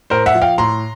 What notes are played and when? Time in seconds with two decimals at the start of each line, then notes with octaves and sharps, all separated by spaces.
0.10 A2 A#4 C5
0.26 E5 F#5
0.34 F3
0.41 F5 G5
0.58 A2 A#5 C6